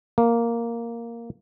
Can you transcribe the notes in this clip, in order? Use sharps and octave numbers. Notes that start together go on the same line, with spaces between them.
A#3